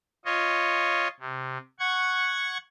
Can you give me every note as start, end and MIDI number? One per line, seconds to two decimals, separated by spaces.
0.25 1.08 65
0.25 1.08 73
0.25 1.08 75
1.20 1.58 48
1.79 2.57 78
1.79 2.57 85
1.79 2.57 92